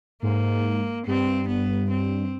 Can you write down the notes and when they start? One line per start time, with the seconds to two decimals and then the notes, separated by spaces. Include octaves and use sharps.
0.22 G#2 A#3
1.06 G2 C4
1.48 B3
1.90 C4